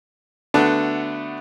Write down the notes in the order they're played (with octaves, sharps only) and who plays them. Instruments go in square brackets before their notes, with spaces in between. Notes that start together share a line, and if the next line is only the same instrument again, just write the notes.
[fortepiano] D3 A3 B3 D4 F#4 A4